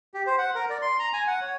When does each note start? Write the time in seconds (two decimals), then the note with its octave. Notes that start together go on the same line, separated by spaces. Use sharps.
0.14 G4
0.27 C5
0.38 F#5
0.55 A#4
0.70 D5
0.82 C6
0.99 A#5
1.13 G#5
1.27 F#5
1.41 C#5